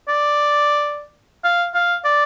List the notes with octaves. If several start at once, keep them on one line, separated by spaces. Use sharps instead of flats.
D5
F5
F5
D5